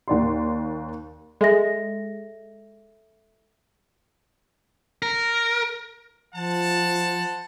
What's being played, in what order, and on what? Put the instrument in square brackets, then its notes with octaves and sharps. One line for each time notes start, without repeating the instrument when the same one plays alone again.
[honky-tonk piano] D#2 D5 C6
[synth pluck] G#3 [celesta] A4 E5 A#6
[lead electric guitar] A#4
[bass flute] F3 [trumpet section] C5 F#5 A5